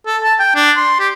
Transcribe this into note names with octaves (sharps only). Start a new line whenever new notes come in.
A4
A5
G5
D4
C6
G4